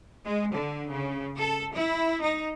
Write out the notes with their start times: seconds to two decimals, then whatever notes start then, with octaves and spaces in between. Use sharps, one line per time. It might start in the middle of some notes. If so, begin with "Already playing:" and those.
0.25 G#3
0.53 D3
0.90 C#3
1.37 A4
1.72 E4
2.21 D#4